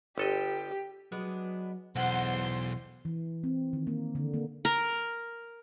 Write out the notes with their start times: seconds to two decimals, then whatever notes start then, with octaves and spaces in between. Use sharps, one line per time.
0.18 G1 G4 A4 D#5
1.12 F#3 G#3 B3 D4
1.96 B1 E2 D3 C5 F5 F#5 C6
3.05 E3
3.44 C4
3.73 D#3
3.87 A#3
4.15 D3
4.34 A#3
4.65 A#4